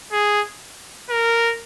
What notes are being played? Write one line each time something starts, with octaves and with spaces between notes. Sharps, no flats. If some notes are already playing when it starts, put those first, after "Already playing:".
G#4
A#4